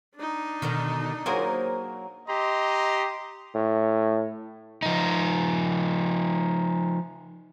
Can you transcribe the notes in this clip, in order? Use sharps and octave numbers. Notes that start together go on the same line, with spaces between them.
D4 D#4
B2 D3 D#3
F#3 A#3 G#4 A#4 C5
G4 D#5 A#5 C6
A2
F3 D#4